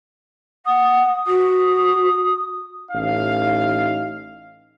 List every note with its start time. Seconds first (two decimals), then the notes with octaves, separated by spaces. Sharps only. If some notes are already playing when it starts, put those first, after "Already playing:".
0.66 F#5 D#6
1.27 F#4 D#6
2.92 A1 D#4 F5